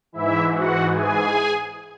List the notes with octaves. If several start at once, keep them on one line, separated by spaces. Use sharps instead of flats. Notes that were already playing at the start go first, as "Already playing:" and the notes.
G#2 E3 E4 E5
F#4 F#5
G#4 G#5